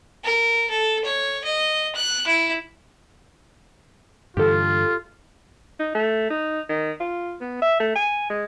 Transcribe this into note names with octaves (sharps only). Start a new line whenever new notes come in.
A#4
A4
C#5
D#5
F#6
E4
G2 D3 E3 F4 G4 A4
D#4
A3
D#4
D#3
F4
B3
E5
A3
G#5
G#3